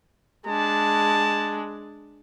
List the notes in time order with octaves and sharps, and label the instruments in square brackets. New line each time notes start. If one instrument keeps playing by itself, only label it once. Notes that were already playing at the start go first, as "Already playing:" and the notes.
[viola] G#3 D4 [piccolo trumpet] A5